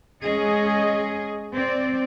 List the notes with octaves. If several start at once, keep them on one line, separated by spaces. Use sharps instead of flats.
G#3 C#4 G#4 D#5
C4 D5